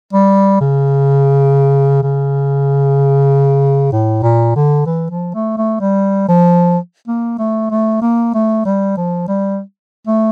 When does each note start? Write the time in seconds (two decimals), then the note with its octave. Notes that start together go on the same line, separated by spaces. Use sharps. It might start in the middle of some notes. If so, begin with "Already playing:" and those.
0.13 G3
0.61 C#3
2.03 C#3
3.92 A2
4.23 A#2
4.55 D3
4.86 E3
5.11 F3
5.34 A3
5.57 A3
5.81 G3
6.28 F3
7.07 A#3
7.39 A3
7.71 A3
8.02 A#3
8.34 A3
8.65 G3
8.97 F3
9.28 G3
10.07 A3